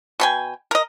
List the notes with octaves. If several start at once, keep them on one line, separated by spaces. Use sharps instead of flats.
B2 G5 G#5
A#4 D#5